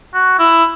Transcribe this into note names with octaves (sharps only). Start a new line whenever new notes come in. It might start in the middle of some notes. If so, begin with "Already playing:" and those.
F#4
E4